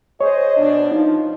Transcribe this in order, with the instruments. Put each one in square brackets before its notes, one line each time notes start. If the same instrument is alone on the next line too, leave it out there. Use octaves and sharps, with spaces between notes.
[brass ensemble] G#4 C5 D#5 [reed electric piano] C#5
[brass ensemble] B2 D4
[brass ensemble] F3 [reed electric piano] D#4